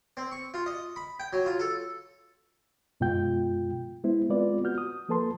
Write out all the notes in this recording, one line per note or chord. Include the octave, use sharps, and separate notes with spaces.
C4
C#6
F4
D#5
B5
G5
F#3
F4
A4
F#2 B2 G#3 F4 G5 G6
G#3 B3 E4 C5
G#3 B3 C4 F4 B4 D5
F#4 F6 G6
D#6
F3 A#3 A4 B4 A5 C6